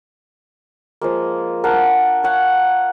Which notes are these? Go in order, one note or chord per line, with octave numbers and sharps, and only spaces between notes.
F3 G#3 A#3
D4 A#4 F#5 A5
C#5 F5 F#5